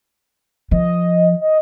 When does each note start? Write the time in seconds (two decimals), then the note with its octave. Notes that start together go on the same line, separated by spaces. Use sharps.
0.71 F3 D#5
1.41 D#5